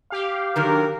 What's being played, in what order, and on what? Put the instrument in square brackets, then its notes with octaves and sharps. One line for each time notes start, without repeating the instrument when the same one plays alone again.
[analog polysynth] G4 F5
[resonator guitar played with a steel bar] D3 D#3 F#3 [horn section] A#4